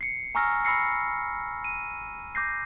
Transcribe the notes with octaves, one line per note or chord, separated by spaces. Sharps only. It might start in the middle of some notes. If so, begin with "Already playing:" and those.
C7 C#7
G#5 A#5 C#6 E6 F6 A#6
B5 E6 A#6 C7 C#7
D#7
D6 G6 A#6 C7